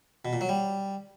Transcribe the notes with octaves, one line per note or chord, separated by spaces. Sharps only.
B2
A#2
F#3
G3